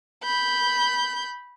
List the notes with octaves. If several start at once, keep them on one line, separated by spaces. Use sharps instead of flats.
B5 G6